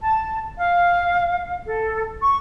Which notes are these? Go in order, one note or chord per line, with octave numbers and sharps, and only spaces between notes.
A5
F5
A4
C#6